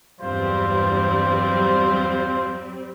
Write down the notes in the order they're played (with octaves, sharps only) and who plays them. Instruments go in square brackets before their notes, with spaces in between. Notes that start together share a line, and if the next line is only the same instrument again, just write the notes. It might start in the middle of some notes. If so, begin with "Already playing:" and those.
[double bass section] E2 G2 [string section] F#3 G3 C4 [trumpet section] F4 C5